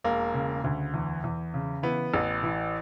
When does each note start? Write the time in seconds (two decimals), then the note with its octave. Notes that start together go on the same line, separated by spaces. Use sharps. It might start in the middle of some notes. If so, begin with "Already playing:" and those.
0.04 E1 A#3
0.34 C#3
0.64 D2
0.94 E2
1.24 E2
1.54 C#3
1.83 E3 B3
2.14 A1
2.43 E3